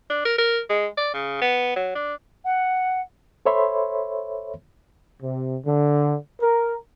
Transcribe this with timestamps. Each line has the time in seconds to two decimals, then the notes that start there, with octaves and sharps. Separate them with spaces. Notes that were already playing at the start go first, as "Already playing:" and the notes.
0.10 D4
0.25 A#4
0.38 A#4
0.70 G#3
0.97 D5
1.14 C#3
1.41 B3
1.76 F#3
1.96 D4
2.45 F#5
3.46 A4 C5 C#5 E5 B5 C6
5.21 C3
5.65 D3
6.40 A#4